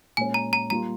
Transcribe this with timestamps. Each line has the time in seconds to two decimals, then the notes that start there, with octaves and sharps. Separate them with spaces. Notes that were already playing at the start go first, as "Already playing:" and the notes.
0.17 A#2 G#3 C#4 G#5
0.34 A#5
0.53 A#5
0.70 G3 A#3 F4 A#5